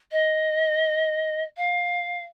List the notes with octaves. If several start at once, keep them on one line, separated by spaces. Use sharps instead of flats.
D#5
F5